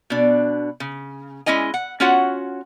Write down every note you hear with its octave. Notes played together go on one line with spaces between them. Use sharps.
B2 D4
C#3
G#3 C#4 E4 D#5 G#5
F#5
C#4 F4 F#4 C#5 F#5